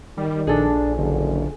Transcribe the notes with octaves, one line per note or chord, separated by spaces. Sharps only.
D#3 G3
A#1 D4 G#4 A4
F#1 D3